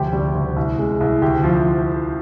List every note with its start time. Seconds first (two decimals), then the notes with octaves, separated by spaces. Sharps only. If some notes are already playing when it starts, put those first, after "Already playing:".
Already playing: F1 D2 G4
0.13 G3
0.35 D2
0.56 C2
0.78 G#3
1.00 C2
1.22 D2 G4
1.44 F3